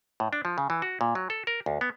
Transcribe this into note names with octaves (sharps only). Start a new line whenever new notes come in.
A2
D4
F3
C#3
E3
F#4
A#2
F#3
A4
A#4
D2
B3